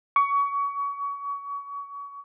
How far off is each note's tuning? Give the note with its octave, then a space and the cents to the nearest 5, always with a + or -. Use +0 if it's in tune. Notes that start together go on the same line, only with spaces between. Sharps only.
C#6 +30